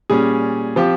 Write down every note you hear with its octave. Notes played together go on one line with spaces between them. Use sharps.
A#2 G3 C#4 G#4
F3 C4 G4